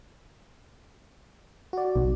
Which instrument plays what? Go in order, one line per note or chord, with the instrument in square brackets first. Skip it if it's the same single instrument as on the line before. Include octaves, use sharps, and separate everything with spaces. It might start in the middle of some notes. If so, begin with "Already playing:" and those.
[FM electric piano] F#4 D5
[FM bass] B1